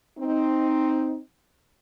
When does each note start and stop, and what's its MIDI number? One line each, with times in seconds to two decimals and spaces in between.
0.19 1.18 60
0.19 1.18 63